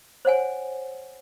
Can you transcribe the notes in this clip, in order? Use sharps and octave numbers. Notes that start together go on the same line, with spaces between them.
C5 C#5 F#5 G#5